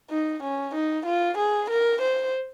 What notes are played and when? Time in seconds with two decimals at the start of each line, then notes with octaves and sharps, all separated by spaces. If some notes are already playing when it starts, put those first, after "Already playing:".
0.10 D#4
0.43 C#4
0.74 D#4
1.06 F4
1.37 G#4
1.70 A#4
2.01 C5